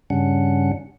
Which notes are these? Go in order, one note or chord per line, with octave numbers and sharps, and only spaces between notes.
G2 C#3 G3 C#4 D4 F#5